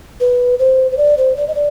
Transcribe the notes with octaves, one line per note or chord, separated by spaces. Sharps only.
B4
C5
C5
D5
C5
D5
D#5
D5